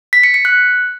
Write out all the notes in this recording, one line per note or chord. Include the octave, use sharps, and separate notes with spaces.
B6
C#7
C#7
F#6